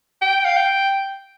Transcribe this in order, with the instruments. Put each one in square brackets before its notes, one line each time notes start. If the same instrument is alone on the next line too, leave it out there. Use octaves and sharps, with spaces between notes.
[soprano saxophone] G5
F5
G5